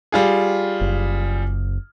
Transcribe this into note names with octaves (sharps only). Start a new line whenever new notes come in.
G3 F4 G#4
F#1